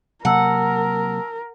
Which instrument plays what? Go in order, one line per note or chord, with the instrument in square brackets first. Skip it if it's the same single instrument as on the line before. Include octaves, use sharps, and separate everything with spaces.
[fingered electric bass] C3 F#3 A#3 [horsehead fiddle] A#4 [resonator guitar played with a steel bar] F#5 [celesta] A5 A#5 E6